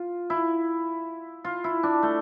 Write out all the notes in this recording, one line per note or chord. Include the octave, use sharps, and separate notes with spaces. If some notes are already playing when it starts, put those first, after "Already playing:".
Already playing: F4
E4
F4
E4
D4
A3